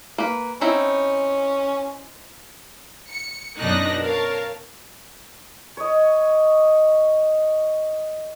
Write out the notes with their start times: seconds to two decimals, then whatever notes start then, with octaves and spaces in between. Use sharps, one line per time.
0.18 A#3 B4
0.61 C4 C#4 D#4 E4
3.09 C#7
3.58 F#2 B2 D4 D#4 F#6 A#6
4.01 A#4 C#5 F5 A5
5.77 C#5 D#5